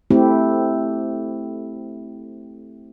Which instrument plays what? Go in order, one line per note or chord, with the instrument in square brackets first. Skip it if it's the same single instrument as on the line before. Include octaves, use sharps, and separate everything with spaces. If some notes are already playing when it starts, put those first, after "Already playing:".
[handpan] A3 C4 E4 G4